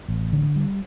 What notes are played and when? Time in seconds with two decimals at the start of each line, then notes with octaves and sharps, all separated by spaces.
0.08 A1
0.33 D3
0.56 G3